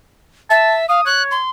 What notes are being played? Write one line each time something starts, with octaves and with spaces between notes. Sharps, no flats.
E5 A5
F5 D#6
C#5 F#6
C6